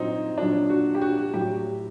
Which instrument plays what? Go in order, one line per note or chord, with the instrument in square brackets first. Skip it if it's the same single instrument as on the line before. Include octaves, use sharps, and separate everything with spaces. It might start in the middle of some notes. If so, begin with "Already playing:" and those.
Already playing: [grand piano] A#2 F#3 C4 D#4
A#2 F#3 D4
F#4
G4
F#4
A2 F#3 G4